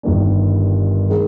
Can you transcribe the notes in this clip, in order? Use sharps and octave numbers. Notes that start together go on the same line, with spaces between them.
G1 G2 D#3 A#3 D4
D#3 G#3